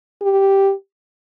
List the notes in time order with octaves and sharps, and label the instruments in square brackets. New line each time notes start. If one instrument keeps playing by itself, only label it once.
[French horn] G4